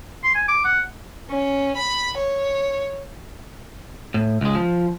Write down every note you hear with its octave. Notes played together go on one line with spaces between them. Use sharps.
C6
G#5
D6
F#5
C#4
B5
C#5
A2
C#2 G#3
F3